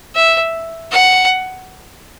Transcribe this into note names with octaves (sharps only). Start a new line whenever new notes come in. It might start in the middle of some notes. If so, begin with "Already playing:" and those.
E5
F#5